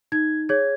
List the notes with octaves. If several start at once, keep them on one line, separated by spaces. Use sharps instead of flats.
D#4 G#6
G#4 C#5 G#6